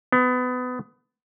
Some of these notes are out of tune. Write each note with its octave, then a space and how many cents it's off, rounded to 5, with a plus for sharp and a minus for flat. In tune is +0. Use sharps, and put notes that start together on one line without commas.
B3 +25